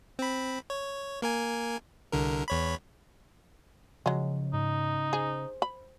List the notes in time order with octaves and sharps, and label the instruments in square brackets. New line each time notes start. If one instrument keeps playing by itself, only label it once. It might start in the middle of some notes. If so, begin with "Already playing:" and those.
[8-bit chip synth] C4 B5
C#5
A#3 A#4 G#5
C2 D3 A#4
E2 C#5 B5
[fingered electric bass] C#3 [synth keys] F3 [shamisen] F#3 G#3
[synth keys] G#2 [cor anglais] D#4
[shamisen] G#4 [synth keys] C5
[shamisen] B5